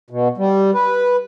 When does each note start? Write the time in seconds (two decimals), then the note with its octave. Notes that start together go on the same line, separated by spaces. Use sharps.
0.10 B2
0.37 G3
0.74 B4